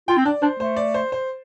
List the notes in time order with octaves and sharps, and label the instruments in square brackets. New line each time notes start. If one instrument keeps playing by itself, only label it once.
[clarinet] F4 [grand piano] G5
[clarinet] C4
[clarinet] D4 [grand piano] D5
[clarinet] D4 [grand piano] C5
[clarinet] A3 [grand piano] C5
[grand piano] D5
C5
C5